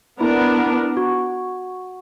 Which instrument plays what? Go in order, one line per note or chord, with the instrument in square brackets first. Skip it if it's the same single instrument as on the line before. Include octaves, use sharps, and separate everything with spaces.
[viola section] B3 D4 A#4 [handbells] E4
[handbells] F#4